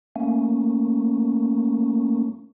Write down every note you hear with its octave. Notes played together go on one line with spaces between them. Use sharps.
A3 A#3 C#4